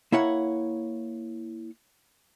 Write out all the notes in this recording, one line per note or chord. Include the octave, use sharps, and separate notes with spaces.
A#3 E4 C#5 F#5